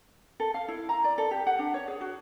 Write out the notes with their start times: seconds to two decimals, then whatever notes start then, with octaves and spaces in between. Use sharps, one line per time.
0.40 A4
0.54 F5
0.68 E4
0.89 A#5
1.04 D5
1.18 A4
1.31 G4
1.47 F#5
1.59 D4
1.74 C#5
1.88 G#4
2.01 F#4